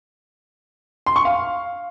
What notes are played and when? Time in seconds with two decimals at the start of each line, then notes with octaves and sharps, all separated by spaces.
1.06 C6
1.16 C#6
1.25 F5